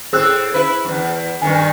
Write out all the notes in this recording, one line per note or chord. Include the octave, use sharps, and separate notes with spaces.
A2 C4 G#4 E6 F#6
E4 B4
E2 G2
G2 D#3 G#5